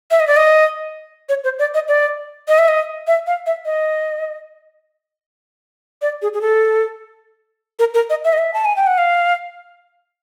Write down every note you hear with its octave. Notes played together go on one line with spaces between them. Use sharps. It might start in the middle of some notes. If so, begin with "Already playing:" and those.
E5
D#5
D5
D#5
C#5
C5
D5
D#5
D5
D#5
E5
D#5
E5
F5
E5
D#5
D5
G#4
G#4
A4
A#4
A#4
D#5
E5
D#5
E5
A5
G#5
G5
F#5
F5